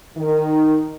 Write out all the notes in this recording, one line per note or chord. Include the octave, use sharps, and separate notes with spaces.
D#3